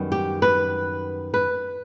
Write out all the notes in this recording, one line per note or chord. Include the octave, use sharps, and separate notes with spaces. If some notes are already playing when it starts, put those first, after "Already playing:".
Already playing: F#2 D#3 G3 B3
G4
B4
B4